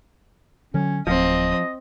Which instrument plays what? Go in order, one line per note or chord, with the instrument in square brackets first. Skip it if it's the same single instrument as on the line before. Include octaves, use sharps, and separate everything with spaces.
[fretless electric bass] D3 F#3 [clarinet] C#4
[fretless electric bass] D1 [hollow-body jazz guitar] F3 [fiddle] C4 D#6 [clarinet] D#5